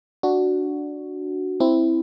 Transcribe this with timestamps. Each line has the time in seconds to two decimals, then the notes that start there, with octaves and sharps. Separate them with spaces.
0.23 D4 F#4
1.60 C4 E4